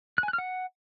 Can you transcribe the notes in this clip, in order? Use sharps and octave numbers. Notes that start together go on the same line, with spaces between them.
F#6
G#5
F#6
F6
F#5